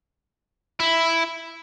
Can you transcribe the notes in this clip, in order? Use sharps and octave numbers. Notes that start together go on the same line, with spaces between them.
E4